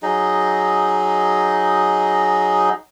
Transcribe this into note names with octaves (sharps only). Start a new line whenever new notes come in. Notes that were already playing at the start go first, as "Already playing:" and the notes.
F#3 D#4 G#4 D#5